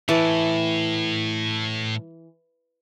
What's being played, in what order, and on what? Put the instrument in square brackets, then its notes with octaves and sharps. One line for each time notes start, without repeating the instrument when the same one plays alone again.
[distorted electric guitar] A2 [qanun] E3 A5